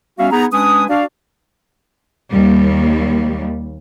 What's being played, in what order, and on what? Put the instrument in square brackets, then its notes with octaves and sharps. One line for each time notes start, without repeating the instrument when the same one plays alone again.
[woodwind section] G3 B3 C#4 F#4 E5 F5
B3 D#4 G#4 A#5
G#3 C#4 D4 B4 G#5 D#6
D4 F#4 D5 F5
[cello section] D#2 G3